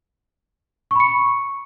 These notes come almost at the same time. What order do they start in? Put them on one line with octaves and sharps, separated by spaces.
C#6 B5 C#7